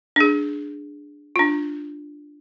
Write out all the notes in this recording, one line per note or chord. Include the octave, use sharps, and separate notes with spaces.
D4 G#4
D4 F4